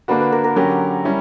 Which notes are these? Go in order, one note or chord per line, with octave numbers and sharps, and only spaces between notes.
D3 A#3 D4 F#4 B4
B4
A#4
A#4
D3 F#3 C#4 G4 A#4
G3 C#4 E4